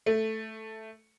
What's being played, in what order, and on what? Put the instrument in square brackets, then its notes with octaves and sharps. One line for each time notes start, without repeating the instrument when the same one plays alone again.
[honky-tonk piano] A3